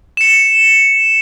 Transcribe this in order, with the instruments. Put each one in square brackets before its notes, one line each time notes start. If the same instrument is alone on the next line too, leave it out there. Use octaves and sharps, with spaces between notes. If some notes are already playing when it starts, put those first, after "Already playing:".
[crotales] C#7 E7